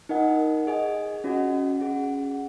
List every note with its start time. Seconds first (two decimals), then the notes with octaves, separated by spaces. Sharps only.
0.09 D#4 A#4 D#5 F#5
0.67 G#4 D#5 G#5
1.24 C#4 F#4 D#5 F#5
1.80 C#4 G#4 F#5